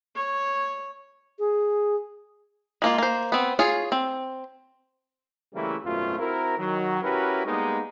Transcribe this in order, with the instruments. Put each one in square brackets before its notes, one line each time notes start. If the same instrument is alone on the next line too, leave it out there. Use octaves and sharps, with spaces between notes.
[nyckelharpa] C#5
[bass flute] G#4
[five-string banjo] G#3 A#3 F4
A#3 C5
B3 C4
F4 G#4 C#5
C4
[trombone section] C#3 E3 G3 A3 A#3 E4
G#1 F#2 B2 A3 F4
C4 E4 F#4 A#4
D#3 F#3
C#4 E4 F#4 G4 A#4 B4
G3 G#3 A#3 B3 D#4